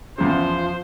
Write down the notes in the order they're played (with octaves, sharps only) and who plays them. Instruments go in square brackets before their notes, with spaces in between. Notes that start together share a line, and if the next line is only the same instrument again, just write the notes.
[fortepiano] E2 C#3 [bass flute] F3 [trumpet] C5